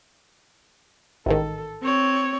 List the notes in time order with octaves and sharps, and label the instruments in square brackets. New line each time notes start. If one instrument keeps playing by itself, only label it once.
[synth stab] A1 G#2 D#3 [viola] A4
[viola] C4 C#5